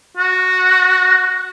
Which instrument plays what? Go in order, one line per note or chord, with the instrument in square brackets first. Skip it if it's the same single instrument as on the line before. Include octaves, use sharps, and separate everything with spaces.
[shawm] F#4